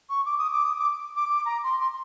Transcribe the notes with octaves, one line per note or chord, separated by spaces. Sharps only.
C#6
D6
D#6
D6
D#6
D6
D6
D6
A#5
C6
C6